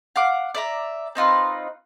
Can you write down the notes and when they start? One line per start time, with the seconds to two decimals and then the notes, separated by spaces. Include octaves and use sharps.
0.16 F5 F#5 D6
0.55 D5 E5 A#5
1.15 C4 D#4 F4 B4